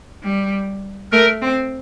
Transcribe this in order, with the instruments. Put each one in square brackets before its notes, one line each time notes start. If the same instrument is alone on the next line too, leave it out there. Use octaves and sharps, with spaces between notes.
[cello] G3
[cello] A3 [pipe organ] A#4
[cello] C4